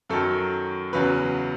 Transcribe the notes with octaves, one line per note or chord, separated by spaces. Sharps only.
F#2 D#3 F#3 A4
E2 C#3 F#3 B4